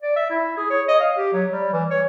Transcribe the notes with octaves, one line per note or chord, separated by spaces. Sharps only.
D5
E5
E4
G#4
C#5
D#5
F5
G4
F#3
G3
E3
C#5